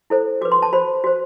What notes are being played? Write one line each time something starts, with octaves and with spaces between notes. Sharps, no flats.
E4 A4 C5
F#4 B4 D6
C6
A5
F#4 C5 B5
F#4 C5